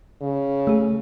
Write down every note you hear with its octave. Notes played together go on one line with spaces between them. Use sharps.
C#3
A3 G#4